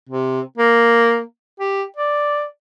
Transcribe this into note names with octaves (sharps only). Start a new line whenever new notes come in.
C3
A#3
G4
D5